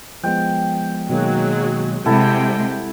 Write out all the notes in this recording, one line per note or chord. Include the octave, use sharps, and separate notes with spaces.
F3 G#3 B3 G5
B2 D#3 F#3 G#3 A#3
C3 G3 G#3 E4 A4 F#5 G5